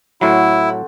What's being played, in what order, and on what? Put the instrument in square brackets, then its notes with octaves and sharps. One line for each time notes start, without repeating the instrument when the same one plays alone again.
[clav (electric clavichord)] A2 F#3 [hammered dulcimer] C4 F#4 A4 [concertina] E4